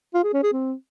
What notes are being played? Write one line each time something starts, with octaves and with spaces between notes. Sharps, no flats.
F4
G#4
C#4
G#4
C4